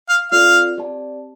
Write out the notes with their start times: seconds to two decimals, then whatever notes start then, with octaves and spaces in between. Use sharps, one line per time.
0.09 F5
0.31 C4 F4 A4 D5 F5
0.78 C4 G4 D5 A5